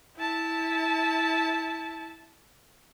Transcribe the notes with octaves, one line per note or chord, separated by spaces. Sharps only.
E4 A5